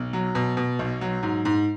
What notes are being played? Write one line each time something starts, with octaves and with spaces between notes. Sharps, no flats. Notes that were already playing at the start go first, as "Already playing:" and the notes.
Already playing: B1
F#3
B2
B2
B1
F#3
G#2
G#2